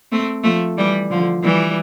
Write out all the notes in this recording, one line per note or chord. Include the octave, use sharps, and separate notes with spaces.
A3 C4
F3 A3
E3 G3
D3 F3
E3 G3